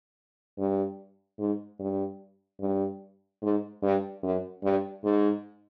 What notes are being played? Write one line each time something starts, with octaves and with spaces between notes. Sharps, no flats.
G2
G#2
G2
G2
G#2
G2
F#2
G2
G#2